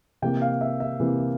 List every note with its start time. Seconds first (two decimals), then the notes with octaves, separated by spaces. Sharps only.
0.22 C3 E3 A#3 G5
0.41 F5
0.61 E5
0.80 E5
1.00 C3 E3 A#3